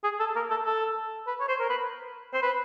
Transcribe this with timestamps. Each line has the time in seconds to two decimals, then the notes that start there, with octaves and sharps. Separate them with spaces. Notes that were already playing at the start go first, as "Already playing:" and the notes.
0.04 G#4
0.20 A4
0.36 A#4
0.50 A4
0.66 A4
1.27 B4
1.40 C#5
1.48 C5
1.60 A#4
1.69 B4
2.34 C5
2.42 B4